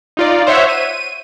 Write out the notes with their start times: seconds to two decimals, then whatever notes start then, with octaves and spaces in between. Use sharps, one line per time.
0.17 D#4 F4 D5
0.47 C5 C#5 E5 F#5
0.69 D#7